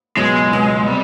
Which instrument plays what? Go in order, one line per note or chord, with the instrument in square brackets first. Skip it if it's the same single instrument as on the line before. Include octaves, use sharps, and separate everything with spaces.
[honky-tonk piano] C#2 B2 F#3 B3 [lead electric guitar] G#3
[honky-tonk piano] C#2 B2 F#3 B3
[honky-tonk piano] C3 [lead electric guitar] G3